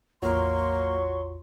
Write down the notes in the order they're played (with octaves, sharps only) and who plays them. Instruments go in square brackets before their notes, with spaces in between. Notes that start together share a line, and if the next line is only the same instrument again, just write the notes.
[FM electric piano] A1 E2 F4 [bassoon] F#3 [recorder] A#3 [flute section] C6 C#6